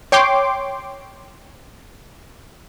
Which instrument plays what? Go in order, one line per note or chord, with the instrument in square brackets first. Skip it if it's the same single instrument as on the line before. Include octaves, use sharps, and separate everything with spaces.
[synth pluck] C#5 G5 C6 D6